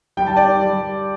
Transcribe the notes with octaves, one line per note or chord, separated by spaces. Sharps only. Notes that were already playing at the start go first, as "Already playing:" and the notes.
G3 G5
A5
D5 G5
G3